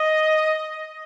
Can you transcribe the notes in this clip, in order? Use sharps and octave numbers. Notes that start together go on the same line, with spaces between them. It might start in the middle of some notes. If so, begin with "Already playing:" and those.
Already playing: D#5